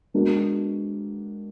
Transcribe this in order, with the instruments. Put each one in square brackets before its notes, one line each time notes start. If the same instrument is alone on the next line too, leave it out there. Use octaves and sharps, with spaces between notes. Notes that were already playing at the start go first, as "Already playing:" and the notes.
[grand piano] G#3 B3 D4 F#4 A#4